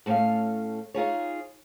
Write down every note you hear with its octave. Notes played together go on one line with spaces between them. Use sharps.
A2 A3 C#4 D5 F5
D#4 F4 G#4 C#5